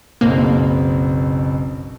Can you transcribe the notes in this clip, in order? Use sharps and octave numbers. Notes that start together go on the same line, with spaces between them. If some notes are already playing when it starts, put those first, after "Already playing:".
F#1 B1 A#3 C4